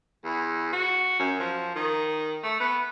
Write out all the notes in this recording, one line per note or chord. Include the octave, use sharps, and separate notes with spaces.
E2
F#4
F#2
F3
D#3
A3
B3